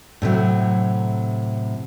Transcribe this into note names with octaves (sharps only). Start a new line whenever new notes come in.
A2 C3 D#3 F#3